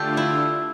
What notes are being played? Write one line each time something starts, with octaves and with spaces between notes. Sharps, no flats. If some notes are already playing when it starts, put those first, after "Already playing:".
Already playing: D3 A3 D4 F4 G4 A4
E4